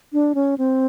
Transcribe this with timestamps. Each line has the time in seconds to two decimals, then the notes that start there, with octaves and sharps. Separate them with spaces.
0.13 D4
0.35 C#4
0.58 C4